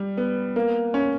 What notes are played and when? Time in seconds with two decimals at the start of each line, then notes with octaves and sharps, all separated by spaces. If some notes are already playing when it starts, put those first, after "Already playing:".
Already playing: G3
0.17 B3
0.56 A#3
0.94 C#4